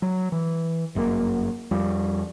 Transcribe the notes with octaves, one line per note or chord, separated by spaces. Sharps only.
F#3
E3
G1 F#2 C3 A#3
F2 F3 G3